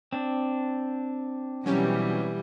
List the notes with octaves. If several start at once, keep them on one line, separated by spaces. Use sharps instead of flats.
C4 D4
B2 E3 F#3 G3 C#4 G4